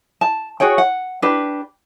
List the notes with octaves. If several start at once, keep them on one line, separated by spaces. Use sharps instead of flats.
A5
F#4 G#4 C#5 G5
F#5
D4 G4 B4